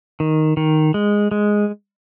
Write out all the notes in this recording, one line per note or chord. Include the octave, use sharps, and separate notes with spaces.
D#3
D#3
G#3
G#3